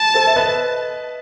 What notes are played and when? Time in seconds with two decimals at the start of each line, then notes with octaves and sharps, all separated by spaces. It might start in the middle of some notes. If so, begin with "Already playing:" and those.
Already playing: A5
0.14 A4 C5
0.27 E5
0.36 B4 D#5